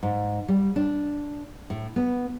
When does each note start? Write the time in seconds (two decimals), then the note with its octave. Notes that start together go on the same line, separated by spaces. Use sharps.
0.03 G#2
0.48 G3
0.76 D4
1.70 A2
1.96 B3